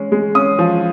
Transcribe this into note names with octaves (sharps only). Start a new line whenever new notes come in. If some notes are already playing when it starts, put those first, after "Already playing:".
Already playing: G#3 C#4
G#3
C#4 D#6
F3